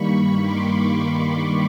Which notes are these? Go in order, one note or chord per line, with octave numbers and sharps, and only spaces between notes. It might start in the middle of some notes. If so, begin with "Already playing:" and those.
Already playing: G2 D#3 G3 A#3 B5 C#6
C6 D6